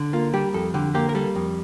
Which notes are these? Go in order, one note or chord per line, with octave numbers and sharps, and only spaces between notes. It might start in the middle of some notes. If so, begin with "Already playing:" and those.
Already playing: D3
A#3 F4
G3 G4
F2 A4
D3 G4
A#3 G4
A#4
G3 A4
F2